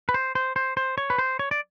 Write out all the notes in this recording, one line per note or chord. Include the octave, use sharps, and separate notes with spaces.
B4
C5
C5
C5
C5
C#5
B4
C5
C#5
D5